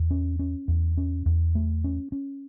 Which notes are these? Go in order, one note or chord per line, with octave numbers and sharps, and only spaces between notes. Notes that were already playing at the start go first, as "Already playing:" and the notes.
Already playing: E2
C#4
C#4
E2
C#4
E2
A3
C#4
C#4